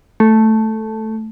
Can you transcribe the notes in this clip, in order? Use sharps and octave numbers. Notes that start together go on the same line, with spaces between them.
A3